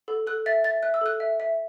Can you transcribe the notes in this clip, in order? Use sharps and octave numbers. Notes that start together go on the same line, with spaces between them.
A4
A4 F#6
E5 A6
E5 A6
E5 F#6
E6
A4 F#6
E5
E5